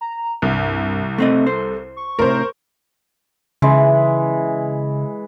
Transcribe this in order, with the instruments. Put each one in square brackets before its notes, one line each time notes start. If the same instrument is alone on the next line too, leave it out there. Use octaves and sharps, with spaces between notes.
[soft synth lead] A#5
[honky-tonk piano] C2 [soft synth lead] G2
[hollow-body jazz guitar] A3 C4 D#5 [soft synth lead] A4
[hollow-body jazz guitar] C5
[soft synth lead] C#6
[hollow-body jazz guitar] A2 C3 [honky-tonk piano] A#4 C5
[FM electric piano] C#3 [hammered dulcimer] E3 G#3